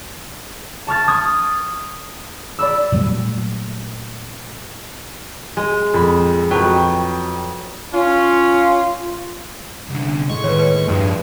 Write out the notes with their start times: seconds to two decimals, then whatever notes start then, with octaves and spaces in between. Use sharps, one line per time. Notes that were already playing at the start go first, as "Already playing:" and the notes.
0.87 A5 C#6 F6 A6
1.08 C#6 D#6 G#6
2.59 D5 B5 E6
2.92 A#2 F#3 G3 A3
5.57 G#3
5.94 F2 B5
6.51 F2 F#3 B4 G5
7.94 C#4 F4
9.89 C2 D3
10.29 A2 G#3 C#6
10.44 D#2 B4 C#5
10.59 B4
10.88 G2 F3 G#3